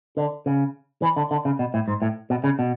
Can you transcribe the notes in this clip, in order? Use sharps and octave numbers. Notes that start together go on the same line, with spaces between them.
D3
C#3
E3
D3
D3
C#3
B2
A2
G#2
A2
B2
C#3
B2